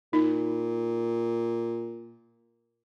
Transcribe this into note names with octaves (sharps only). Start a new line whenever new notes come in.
A#2 D#4